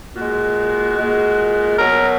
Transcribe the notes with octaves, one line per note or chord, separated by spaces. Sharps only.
A#2 G#3 F#4
A#2 G#3
B2 F#3 A#4